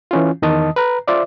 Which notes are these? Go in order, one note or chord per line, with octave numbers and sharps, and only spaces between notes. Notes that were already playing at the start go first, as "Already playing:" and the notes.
E3 C#4 F4
E2 D#3 D#5 A5 D#6
B4 A#5
F4 C5 D5 E5